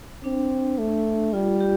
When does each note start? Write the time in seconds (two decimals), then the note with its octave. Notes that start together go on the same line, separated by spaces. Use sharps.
0.24 C4 D4
0.78 A3
1.33 G3 F4
1.61 G4